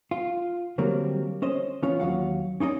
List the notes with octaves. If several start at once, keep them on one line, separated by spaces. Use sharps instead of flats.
F4
D3 F#3 G3 A#3 C4
C#4 C5 D#5
E3 C#4 F4
D#2 A#2 F#3 F5 F#5
C#4 D#4 E4 D5 D#5